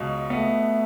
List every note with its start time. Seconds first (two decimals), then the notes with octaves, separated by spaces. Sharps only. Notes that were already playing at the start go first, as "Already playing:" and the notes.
Already playing: C#2 B2
0.30 A3 B3